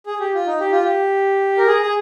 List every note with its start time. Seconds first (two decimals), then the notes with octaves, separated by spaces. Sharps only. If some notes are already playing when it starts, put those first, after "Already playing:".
0.06 G#4
0.20 G4
0.34 F4
0.47 D#4
0.60 G4
0.72 F4
0.84 G4
1.58 A#4
1.67 G#4
1.82 G#4